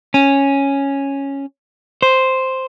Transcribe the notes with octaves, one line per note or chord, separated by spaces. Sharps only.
C#4
C5